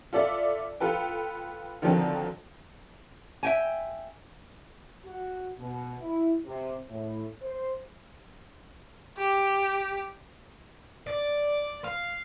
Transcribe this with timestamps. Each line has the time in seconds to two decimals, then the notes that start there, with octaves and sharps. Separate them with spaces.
0.13 F4 A4 D5 E5
0.80 F4 A4 B4 G5
1.82 D3 D#3 F3 F#3 C4
3.43 E5 G5 G#5
5.04 F#4
5.58 B2
6.00 E4
6.45 C3
6.89 A2
7.42 C5
9.18 G4
11.07 D5
11.84 F5